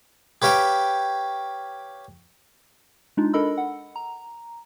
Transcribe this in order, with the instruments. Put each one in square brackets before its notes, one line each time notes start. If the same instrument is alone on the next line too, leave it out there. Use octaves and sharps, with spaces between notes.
[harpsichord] G4 B4 C#5 F5 G5
[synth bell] G#3 D4 D#4 F4
D4 A4 A#4 D#5 B5 E6
F#5
A#5